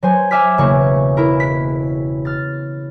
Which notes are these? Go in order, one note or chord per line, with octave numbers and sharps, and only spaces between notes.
F#3 C5 G#5
E5 G#5 D6 F6 B6
E1 C#3 A#3 F#4 C#5 C#6
E4 A#4
F#6 B6
F6 A6